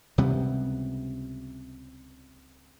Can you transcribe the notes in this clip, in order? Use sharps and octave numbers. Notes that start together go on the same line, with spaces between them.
C#2 C3 G3 B3